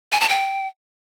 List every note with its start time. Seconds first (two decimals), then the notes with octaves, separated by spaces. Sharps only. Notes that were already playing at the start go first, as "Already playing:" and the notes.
0.12 G#5
0.21 A5
0.29 G5